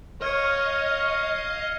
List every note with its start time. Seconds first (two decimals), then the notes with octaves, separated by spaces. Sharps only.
0.22 C#5 D#5 F5 F6 G#6 C#7